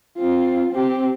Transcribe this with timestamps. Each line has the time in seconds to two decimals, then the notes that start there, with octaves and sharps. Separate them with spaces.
0.18 C4 F4
0.72 C4 G4